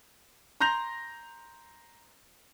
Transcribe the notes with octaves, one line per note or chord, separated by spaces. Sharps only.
A#5 C6 G6 A#6 F7